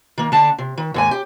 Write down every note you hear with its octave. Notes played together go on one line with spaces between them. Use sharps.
D#3 A#3
D3 D4 A5
C3
D#3
D#2 G#2 G#5
G4